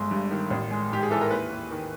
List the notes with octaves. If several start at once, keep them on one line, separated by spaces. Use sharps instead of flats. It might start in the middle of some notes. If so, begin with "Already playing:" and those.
Already playing: G1 G#3
G2
D#3
A1
G#3
G#2 G4
G#4
E3 A4
A#4
D#2 B4
D#2
D#3